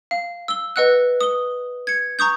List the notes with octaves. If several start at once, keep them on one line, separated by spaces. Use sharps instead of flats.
F5
E6 G7
B4 D#5 F#5 E6 F#6
D#6 G7
G#6 C#7
A#5 C#6 D#6 G6